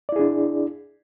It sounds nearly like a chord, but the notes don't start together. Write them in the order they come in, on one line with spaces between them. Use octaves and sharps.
D5 E4 G#4 D4